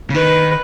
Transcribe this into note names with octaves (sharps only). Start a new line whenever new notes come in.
C#3
D#3 B4